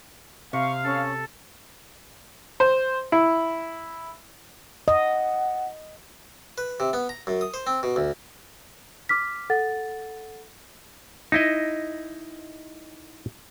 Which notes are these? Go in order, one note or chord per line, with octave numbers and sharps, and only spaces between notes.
C3 F5 C#6
C#4 A4
C5
E4
D#5 F#5
B4
C3
B3
A#5
F#2
D#6
C5
C4
B2
D2
D6 F6 B6
A4 F#5 A6
D#4 E4 D#5